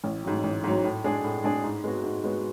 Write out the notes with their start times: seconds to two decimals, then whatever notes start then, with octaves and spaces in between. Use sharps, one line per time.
0.04 A1
0.24 G#2 F#3
0.44 A1
0.64 G#2 F#3
0.84 A2
1.04 G#3 D4 G#4
1.24 A2
1.44 G#3 D4 G#4
1.64 G#2
1.84 G#3 B3 F#4
2.04 G#2
2.24 G#3 B3 F#4